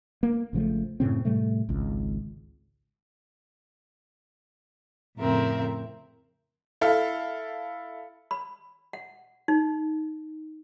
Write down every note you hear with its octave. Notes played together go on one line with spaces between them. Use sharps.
A#3
G#1 C#3 F3 A3
F#2 A2 C#3 C4
A2 C3 G3 A3
G#1 C#2
F2 A2 C#3 C4 A#4 E5
E4 A4 F5
B5
F#5
D#4